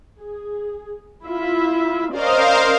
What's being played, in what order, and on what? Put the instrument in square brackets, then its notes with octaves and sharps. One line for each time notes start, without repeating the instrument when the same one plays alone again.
[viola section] G#4
E4 F4 E5
[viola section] C#4 D5 D#5 [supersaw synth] A#4 C5 F5